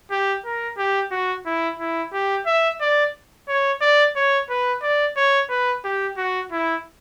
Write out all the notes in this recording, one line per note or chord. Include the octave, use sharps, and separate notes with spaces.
G4
A#4
G4
F#4
E4
E4
G4
E5
D5
C#5
D5
C#5
B4
D5
C#5
B4
G4
F#4
E4